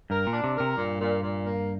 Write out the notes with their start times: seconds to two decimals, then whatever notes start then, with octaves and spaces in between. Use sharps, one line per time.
0.10 G2 A#4
0.27 A#2
0.32 D4
0.44 C3
0.55 A#4
0.60 C3
0.77 G2 A#2
0.99 A#2
1.23 A#2
1.44 A#3